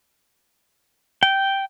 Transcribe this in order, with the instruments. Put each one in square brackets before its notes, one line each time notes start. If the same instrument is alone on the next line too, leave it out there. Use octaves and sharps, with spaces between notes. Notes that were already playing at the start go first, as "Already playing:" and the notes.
[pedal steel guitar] G5